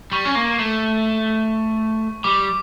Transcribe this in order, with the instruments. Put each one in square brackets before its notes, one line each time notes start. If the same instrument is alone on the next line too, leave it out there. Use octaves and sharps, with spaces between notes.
[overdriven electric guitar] G3 [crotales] C#6
[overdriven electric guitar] C#4
A#3
A3
[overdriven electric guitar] G3 [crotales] D6